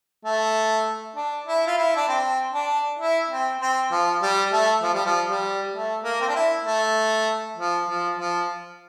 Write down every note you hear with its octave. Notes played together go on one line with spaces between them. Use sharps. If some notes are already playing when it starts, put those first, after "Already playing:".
A3
D4
E4
F4
E4
D4
C4
D4
E4
C4
C4
F3
G3
A3
F3
G3
F3
G3
A3
A#3
C4
D4
E4
A3
F3
F3
F3